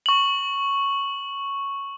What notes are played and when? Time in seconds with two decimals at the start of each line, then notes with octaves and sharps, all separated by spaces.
0.06 C#6 F#7